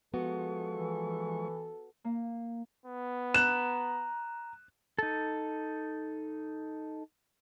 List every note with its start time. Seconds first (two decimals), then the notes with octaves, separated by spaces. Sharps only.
0.14 F3 G#3 B3 F#4 A4 C#6
0.75 E3
2.05 A#3
2.86 B3
3.34 A#5 F#6 E7
4.99 D#4 A4